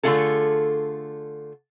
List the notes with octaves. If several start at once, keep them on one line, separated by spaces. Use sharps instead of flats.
D3 A3 F4 G#4 A4